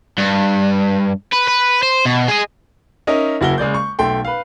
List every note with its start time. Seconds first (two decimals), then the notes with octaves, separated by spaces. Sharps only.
0.18 G2
1.32 B4
1.47 B4
1.83 C5
2.05 B2
2.28 G#4 D#5
3.07 C#4 D#4 A#4 D#5 E5
3.41 F#1 E4 F#4 A#4 G7
3.58 C#3 G#3 D5 G6
3.74 C#6
3.99 B1 A3 G5 C6
4.25 B4 F5